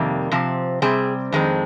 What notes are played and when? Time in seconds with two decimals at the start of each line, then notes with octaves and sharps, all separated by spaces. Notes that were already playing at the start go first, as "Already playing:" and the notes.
Already playing: F2 C3 D#3 G3 A#3
0.32 C3 F3 C4
0.82 C3 G3 C4 G#4
1.32 F2 D#3 G#3 C4